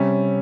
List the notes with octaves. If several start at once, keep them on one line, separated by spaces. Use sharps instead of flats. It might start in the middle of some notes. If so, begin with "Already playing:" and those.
Already playing: C3 G3 C#4